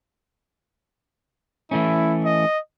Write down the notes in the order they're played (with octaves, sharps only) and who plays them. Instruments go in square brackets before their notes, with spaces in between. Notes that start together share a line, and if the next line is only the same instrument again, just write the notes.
[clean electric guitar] E3 A3 C#4 [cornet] E4
[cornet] D#5